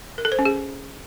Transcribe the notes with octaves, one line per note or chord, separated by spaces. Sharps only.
A#4
A4
C5
C#4
G#4